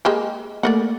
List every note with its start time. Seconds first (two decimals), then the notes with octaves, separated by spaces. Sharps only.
0.05 G#3 A#3 G4
0.63 A3 A#3 D5 D#5 F#5